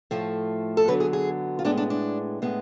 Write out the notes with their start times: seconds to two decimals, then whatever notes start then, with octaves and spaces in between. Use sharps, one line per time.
0.11 A2 F3 A3
0.77 A4
0.87 F#2 D3 F#3 B3 B4
1.00 G#4
1.13 G#4
1.59 F4
1.64 A2 G#3 B3 D4
1.77 D4
1.90 D4
2.42 A2 G#3 B3